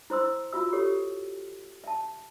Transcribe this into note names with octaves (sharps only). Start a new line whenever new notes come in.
E4 C5 C6 E6
F4 F#4 E5 E6
G4 A4 C#5
E5 A5